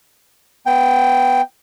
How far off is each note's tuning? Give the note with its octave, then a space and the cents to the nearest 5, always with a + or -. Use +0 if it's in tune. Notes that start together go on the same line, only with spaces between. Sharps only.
B3 +10 G5 +0